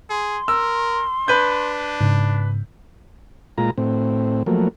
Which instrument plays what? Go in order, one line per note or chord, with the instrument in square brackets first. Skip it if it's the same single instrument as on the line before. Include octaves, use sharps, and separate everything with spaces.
[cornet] G#4 [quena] C6
[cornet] A#4 [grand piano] E6
[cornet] D4 [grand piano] B4 G6
[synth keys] G#2 C#3
[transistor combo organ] A#2 G#3 F4 A#5
A2 C4
F3 F#3 A3 A#3